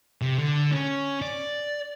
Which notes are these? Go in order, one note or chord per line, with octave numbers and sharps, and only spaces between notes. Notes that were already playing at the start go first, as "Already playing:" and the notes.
C3
D3
C#4
D5